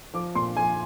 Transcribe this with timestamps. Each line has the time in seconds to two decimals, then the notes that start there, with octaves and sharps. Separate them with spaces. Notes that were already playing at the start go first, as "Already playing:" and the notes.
0.14 F3 D6
0.35 A#2 C6
0.56 F3 G#5